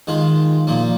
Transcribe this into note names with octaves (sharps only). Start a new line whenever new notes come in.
D#3 G#3 F4
A#2 F3 A#3